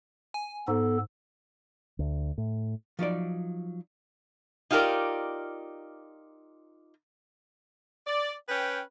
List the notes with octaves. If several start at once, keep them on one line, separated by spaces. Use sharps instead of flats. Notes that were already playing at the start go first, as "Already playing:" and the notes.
G#5
G#2 B3 A4
D2
A2
F3 F#3 D#4 D5
D#4 F4 G4 G#4 A#4 D5
D5
C#4 B4 G5